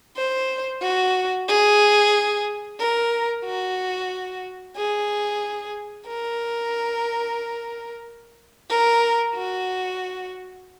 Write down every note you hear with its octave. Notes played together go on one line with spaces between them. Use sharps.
C5
F#4
G#4
A#4
F#4
G#4
A#4
A#4
F#4